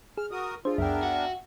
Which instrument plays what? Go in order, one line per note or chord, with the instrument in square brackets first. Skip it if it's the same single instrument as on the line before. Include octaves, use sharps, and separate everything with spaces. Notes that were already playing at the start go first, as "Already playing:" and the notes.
[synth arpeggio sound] G#4 [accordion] F6
[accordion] F#4 A#4 D#6
[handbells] D4 G#4 [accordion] F4 [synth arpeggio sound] C5
[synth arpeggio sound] C#2 F#2 [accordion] B3 D4 A#4 [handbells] E5 G5
[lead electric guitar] F#4